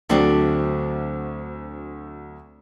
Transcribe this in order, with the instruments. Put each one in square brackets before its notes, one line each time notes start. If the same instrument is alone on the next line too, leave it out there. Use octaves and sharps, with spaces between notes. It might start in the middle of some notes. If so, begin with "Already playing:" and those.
[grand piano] D2 D3 F#3 [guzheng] A3 C4 D4